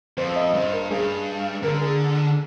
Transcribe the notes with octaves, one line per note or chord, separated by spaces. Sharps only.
F2 C5
D#5
G2 C5
A#4
G2 G#4
D3 A#4
G#4